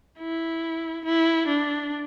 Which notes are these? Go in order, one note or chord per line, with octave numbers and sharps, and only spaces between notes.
E4
E4
D4